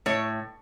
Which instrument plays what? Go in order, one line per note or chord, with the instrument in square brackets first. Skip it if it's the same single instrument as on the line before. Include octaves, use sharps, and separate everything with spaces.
[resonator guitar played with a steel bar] A2 C#5